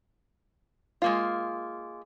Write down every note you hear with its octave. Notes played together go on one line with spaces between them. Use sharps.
G#3 A#3 F4